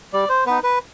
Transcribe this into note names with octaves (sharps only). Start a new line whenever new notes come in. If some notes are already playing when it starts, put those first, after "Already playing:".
G3 D5
C5
B3 D#4 B4
B4